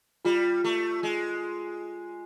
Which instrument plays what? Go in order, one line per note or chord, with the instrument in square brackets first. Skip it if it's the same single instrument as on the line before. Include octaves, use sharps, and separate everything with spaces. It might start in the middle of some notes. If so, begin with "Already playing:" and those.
[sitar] G3 [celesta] F4
[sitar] A3
G#3